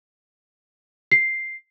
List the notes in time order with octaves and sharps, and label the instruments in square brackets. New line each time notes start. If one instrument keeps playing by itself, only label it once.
[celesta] C7